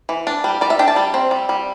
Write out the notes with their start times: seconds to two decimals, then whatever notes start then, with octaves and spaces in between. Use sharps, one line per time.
0.09 E3
0.27 D4
0.44 G3
0.61 G3 D5
0.70 E5
0.79 D4 G5
0.88 A5
0.96 G3
1.14 C4
1.31 G3
1.49 G3